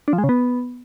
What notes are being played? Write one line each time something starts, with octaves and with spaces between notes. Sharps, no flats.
D4
F3
G#3
C#3
B3